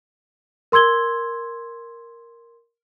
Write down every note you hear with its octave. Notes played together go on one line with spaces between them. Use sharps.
A#4 C6 E6 G#6 G7